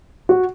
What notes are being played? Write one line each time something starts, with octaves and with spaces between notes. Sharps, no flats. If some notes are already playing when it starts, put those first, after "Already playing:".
F#4